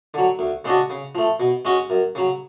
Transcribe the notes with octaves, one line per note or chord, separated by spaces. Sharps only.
D3 F#3
D2
C#3 G#3 D4 F#4
C#3
F3 A3
B2
G#3 C#4 F#4
F#2
C#3 F#3